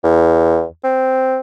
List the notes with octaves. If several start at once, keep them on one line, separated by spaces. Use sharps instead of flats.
E2
C4